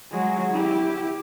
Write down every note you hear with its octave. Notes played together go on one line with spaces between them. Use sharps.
F#3 G#3
E4 G4